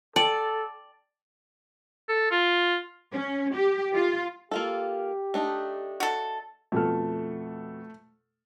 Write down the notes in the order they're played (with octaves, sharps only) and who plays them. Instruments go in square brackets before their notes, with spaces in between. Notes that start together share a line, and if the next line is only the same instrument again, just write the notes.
[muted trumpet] A4 [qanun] D5 [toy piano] G5 A5
[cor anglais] A4
F4
[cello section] C#4
G4
F4
[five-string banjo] A#3 F4 A4 [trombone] G4
[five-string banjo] A3 D4 D#4
[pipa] F#4 A4
[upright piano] F2 B2 F6 [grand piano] A3 A4